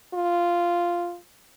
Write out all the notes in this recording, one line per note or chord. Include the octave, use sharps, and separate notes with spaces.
F4